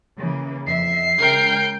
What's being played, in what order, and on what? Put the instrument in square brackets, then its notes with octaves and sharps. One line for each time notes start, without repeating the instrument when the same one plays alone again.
[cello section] C#3 E3 A#3
[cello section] F2 E5 [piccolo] C7
[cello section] C#3 G#3 [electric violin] A#4 G5